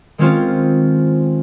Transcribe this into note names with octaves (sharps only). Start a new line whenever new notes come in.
D#3 G#3 C4 C#4 F4 C5